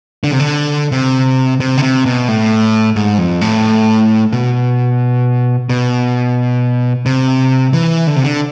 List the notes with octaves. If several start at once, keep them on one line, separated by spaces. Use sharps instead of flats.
D3
C3
D3
C3
C3
D3
C3
B2
A2
G#2
F2
A2
B2
B2
C3
E3
D3
C3
D3